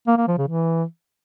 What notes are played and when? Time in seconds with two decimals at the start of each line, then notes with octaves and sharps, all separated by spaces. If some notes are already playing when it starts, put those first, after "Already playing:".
0.07 A#3
0.18 A#3
0.28 F3
0.38 C#3
0.48 E3